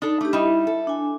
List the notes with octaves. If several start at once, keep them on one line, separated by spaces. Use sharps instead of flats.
D4 D#4 A4
A3 D4 G4
G3 D#4 E4 E5
A4
D4 G#5